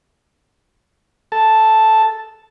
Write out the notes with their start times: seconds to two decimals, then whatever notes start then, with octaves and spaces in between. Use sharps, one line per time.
1.32 A4 A5